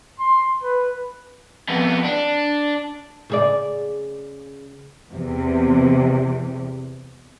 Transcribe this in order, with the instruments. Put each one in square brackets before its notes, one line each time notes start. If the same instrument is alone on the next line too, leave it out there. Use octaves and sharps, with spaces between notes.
[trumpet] C6
B4
[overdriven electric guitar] F2 B3
D4
[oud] C#3 G#4 D5
[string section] E2 C3